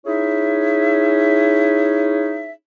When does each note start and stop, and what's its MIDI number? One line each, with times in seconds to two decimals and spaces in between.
0.05 2.50 61
0.05 2.50 63
0.05 2.50 64
0.05 2.50 68
0.05 2.50 76